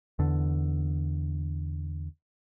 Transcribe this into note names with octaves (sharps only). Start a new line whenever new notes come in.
E2 D3